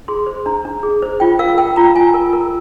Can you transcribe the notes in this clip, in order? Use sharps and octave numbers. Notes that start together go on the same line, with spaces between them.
G#4 C6
C5
D4 A#5
D4
G#4
C5
F4 G5
A#4 F5
A#4 G5
F4 A#5
F4 G#5
A#4
A#4